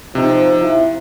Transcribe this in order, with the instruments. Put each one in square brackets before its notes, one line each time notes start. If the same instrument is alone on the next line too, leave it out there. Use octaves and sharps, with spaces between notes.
[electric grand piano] C3 D#4 [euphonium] F3
[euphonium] E4